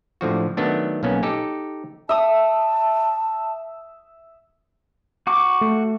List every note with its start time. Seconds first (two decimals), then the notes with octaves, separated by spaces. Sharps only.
0.21 A2 D3 F3 F#4
0.57 D#3 F#3 A3 B3 D4
1.03 B1 A#3 B3 C#4
1.23 D#4 G4 A4
2.09 E5 A5 D#6
5.27 F#4 C#6 D6
5.61 A3